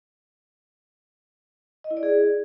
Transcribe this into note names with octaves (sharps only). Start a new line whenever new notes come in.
D#5
E4
D5
G#4